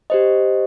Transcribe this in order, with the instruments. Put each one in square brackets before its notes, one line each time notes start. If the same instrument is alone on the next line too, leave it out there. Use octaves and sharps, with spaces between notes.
[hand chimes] G4 C5 D#5